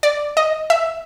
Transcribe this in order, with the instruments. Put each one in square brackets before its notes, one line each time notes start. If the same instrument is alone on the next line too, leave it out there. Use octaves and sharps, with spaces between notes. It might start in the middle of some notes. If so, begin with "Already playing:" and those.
[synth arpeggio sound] D5
D#5
E5